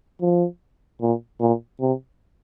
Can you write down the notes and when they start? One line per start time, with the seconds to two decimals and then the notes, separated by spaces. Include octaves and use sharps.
0.21 F3
1.01 A#2
1.40 A#2
1.80 C3